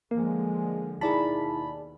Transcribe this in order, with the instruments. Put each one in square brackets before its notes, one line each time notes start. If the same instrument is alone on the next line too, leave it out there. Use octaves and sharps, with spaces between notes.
[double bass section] D3 F3 G#3 [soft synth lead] A#3
[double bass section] D#2 B2 [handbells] D#4 E4 [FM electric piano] G#4 D5 A5 [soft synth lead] B5